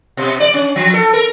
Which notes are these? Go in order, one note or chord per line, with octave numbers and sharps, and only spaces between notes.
B2
D5
C#4
F3
A4
A#4